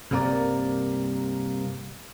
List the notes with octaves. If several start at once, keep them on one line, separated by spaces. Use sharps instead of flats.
C2 G2 C3 A#3 A#4 D5